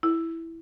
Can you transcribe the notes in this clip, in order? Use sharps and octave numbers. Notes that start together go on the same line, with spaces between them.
E4